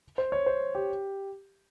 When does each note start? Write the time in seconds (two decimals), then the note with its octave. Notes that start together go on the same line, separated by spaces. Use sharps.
0.18 C5
0.32 C#5
0.46 C5
0.75 G4